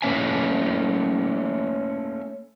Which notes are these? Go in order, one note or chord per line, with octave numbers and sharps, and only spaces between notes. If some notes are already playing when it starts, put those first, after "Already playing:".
A3 A#3 C#4 E5 G#5